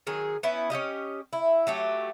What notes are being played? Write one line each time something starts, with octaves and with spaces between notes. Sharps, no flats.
D#3 F#3 G#4
B3 C#4 E4
C#4 E4 G4 D#5
E4
F#3 A3 G4